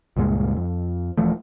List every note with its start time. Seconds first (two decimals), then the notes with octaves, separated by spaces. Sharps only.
0.17 C#2 G2 A#2 G#3
0.57 F2
1.18 D#1 E3 F3 A3